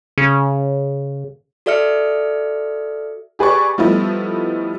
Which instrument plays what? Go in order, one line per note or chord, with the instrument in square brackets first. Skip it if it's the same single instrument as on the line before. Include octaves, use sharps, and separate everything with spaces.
[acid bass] C#3
[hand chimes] F#4 A4 D5 E5 F6 C#7
[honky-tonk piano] G4 G#4 B4 D5 C#6
F3 G3 A3 B3 D#4 E4